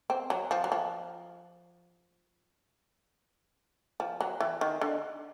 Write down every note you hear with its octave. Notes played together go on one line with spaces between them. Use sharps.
C4
F#3
F3
F#3
F3
F3
F#3
E3
D#3
D3